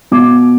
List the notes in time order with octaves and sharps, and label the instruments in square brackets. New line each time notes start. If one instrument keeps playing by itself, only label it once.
[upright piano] B2 D6